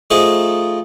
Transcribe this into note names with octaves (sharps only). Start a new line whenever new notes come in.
F3 A3 D#4 G#4